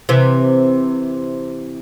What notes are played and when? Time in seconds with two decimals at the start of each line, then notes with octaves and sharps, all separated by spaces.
0.09 C3 E3